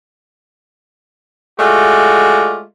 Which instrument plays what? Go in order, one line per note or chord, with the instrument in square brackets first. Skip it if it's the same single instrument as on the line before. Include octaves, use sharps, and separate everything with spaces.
[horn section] G#3 A3 F4 F#4 D5